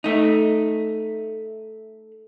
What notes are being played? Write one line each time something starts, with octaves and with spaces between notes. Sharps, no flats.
A3 D#4